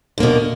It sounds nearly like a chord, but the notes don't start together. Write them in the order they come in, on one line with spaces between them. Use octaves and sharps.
D3 A#3 B2